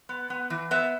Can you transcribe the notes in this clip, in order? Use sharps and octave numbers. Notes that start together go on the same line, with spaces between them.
B3
B3
E3
B3 E5